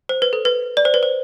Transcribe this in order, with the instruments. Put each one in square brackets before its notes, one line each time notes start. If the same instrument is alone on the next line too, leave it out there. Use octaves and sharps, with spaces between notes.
[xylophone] C5
B4
A4
B4
D5
C5
B4
C5